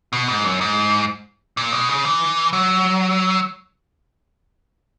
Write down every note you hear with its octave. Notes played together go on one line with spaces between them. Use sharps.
B2
G#2
F#2
G#2
A#2
B2
C#3
E3
F#3